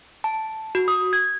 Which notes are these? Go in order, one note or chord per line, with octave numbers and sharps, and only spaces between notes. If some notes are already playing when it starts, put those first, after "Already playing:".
A5
F#4
D#6
G#6